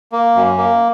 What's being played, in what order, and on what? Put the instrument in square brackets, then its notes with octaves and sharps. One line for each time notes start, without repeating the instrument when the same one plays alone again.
[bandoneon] A#3
F#2
A#3